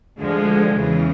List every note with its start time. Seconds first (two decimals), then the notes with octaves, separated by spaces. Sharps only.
0.18 D2 D3 F3 G#3
0.74 E2 C#3 E3